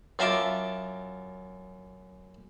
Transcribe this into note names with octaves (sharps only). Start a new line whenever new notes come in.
F#2 F4 D#5 E5 A5 D6